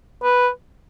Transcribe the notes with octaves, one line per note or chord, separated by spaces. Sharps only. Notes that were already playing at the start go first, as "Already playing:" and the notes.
B4